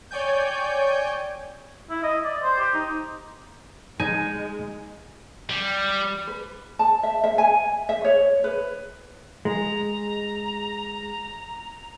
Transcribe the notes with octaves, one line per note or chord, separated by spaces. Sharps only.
C#5 D5 G5 G#5 G6
E4
D#5
D5
C5
G4
D#4
G#3 D#4 G#5
G3
B4
A5
E5
E5
G#5
E5
C#5
B4
G#3 A#5